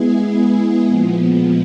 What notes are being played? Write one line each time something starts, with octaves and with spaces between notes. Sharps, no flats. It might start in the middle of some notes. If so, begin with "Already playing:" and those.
Already playing: G#3 B3 E4 G#4
A#2 F3 G#3 B3